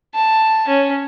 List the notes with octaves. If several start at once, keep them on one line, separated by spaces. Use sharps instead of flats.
A5
C#4